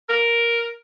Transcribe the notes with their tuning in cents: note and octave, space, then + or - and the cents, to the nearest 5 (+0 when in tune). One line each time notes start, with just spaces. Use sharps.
A#4 +5